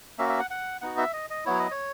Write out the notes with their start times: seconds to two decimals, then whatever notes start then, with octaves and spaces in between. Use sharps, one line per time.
0.18 A#3 C#4 F#4 E5
0.29 E5
0.39 F#5
0.50 F#5
0.81 B3 D#4 F#4 F#5
0.98 E5
1.13 D#5
1.30 D#5
1.45 F#3 B3 E4 C#5
1.59 D#5
1.71 C#5